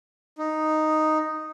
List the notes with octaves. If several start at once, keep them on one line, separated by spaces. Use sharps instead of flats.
D#4